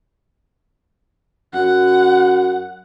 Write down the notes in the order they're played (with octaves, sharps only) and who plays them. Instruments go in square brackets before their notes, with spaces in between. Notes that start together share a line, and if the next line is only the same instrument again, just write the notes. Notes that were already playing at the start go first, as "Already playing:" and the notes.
[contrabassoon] F#2 [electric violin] F#5